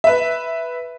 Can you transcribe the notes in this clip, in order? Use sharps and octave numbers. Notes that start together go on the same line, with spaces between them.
B4 E5